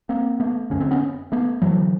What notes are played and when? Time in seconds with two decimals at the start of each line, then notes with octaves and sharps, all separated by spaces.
0.09 A#3 C4
0.40 A3 B3
0.70 F#2 D3 C#4
0.80 C4
0.91 B3 C#4
1.32 A3 B3
1.62 F#2 D3 E3 F#3